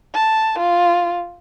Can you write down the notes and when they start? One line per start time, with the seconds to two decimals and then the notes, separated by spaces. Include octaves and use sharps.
0.14 A5
0.59 F4